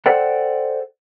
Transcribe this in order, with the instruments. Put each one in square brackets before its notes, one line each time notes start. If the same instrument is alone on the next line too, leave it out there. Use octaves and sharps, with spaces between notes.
[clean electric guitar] A4 C5 D5 F#5 G5